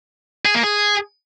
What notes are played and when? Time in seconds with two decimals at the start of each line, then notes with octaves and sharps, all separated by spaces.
0.45 G#4
0.55 A#3
0.64 G#4